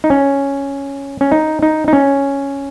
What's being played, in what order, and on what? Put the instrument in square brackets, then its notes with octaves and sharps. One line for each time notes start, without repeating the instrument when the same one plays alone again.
[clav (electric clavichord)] D#4
C#4
C#4
D#4
D#4
D#4
C#4